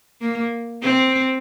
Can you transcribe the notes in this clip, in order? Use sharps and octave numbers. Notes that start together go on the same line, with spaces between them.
A#3
C4